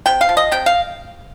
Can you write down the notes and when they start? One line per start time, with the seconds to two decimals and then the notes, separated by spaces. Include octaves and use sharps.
0.06 C3 G5
0.21 F5
0.29 F3
0.37 D#5
0.51 C3 G5
0.66 F5